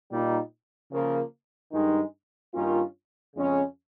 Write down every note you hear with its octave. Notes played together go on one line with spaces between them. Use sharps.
A#2 G3 A#3 D#4
C#3 F3 A#3
G2 D#3 G#3 D#4
G2 D#3 A#3 C#4 F4
F2 C#3 G#3 C#4